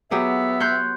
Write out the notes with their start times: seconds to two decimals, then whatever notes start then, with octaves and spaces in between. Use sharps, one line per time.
0.11 F#3 B3 G4 G#4 E5
0.60 C#5 C6 F#6 G6